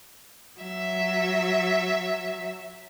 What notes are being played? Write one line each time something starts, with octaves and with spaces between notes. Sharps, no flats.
F#3 E5